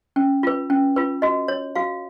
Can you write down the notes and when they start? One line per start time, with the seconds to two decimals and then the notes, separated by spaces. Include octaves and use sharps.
0.16 C#4
0.43 F4 B4
0.70 C#4
0.96 F4 B4
1.22 F#4 D#5
1.48 C#5
1.75 F#4 F5